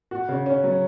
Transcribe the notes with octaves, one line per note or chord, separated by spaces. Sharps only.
F#4
C#3
C#4
F#3